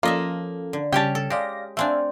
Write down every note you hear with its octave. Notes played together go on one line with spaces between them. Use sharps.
F3 A#3 C#4 F4 A4 D#5 E5
D3
C#3 G3 C#4 G4 C#5 G5 A5
A4
G#3 G4 D5 F5 A#6
A3 C4 D4 E5 F5 G#5